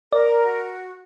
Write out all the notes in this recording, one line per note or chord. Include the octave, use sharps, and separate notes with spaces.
A#4 D5
F#4